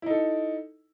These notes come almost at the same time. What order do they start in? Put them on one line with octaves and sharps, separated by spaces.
E4 D#4 A4